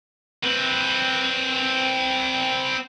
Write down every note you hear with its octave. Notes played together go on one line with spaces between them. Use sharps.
C4 B4